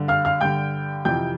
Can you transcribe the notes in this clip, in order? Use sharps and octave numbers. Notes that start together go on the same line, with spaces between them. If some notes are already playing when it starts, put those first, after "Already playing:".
Already playing: G2 D3
F5 F6
F5 F6
G2 D3 G5 G6
F2 C3 E3 G5 G6